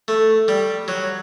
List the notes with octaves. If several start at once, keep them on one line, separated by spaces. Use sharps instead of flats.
A3
G3
F#3